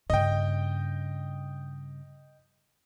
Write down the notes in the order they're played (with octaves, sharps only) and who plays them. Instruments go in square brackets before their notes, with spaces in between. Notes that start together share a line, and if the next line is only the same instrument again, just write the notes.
[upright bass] G2 C#3 [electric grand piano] D#5 G5